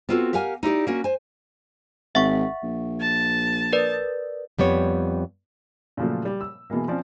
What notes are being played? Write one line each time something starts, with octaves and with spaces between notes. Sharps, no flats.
B3 C4 F4 F#4 A4
G4 A#4 F5 F#5 G#5
D#4 E4 G4 D5
A#3 C#4 F#4
C5 G#5
G#1 E5 F#5 C#6
A#1
A5
A#4 B4 D5
F2 G3 B3 C#5
A#2 C#3 F3 F#3 A3
G3
E6
B2 E3 G#3 A#3
F3 C4 C#4 D5